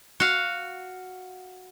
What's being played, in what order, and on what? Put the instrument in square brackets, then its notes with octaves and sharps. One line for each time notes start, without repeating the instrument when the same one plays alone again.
[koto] F#4 F5